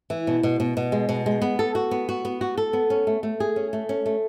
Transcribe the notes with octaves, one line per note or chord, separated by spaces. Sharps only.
E3
B2
B2
B2
B2
G#3
B2
G#3
B3
A4
F#4
B3
F#4
B3
F#4
A4
B3
C#4
A3
A3
G#4
C#4
A3
C#4
A3